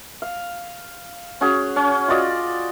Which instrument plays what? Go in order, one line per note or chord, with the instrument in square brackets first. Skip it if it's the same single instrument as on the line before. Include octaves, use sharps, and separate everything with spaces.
[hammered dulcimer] F5
C#4 F#4 G#4
C#4
F4 F#4 D5 D#5